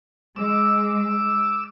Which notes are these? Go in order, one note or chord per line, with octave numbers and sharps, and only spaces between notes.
G#3 D6 E6